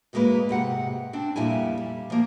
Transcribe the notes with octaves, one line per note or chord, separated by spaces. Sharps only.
D2 G#2 G#3 A#3 B4
G#2 C3 F#5
C4 D4
F2 A#2 G3 E4 G#5
G3
F3 A#3